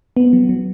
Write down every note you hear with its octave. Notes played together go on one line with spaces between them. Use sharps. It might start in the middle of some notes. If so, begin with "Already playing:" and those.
B3
F#3
F#3